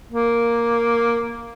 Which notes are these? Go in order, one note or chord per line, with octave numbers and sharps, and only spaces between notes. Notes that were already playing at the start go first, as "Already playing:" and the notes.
A#3